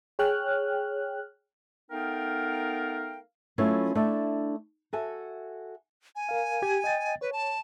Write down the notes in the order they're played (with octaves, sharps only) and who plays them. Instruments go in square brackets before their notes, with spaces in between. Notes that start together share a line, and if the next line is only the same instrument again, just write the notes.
[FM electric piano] G#4 C#5 G5 F6 F#6
[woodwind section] A3 B3 D#4 A#4 F5 G5
[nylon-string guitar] F#3 A3 C#4 E4 F4 B4
A3 D4 E4 E5
F#4 A4 E5 G#5
[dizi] G#5
[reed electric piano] A#4 F5
G4 G#6
D#5 G5 A6
[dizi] B4 [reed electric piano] C#5
[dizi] A5